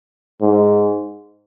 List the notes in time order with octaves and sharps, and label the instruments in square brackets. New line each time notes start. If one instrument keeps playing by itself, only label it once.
[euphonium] G#2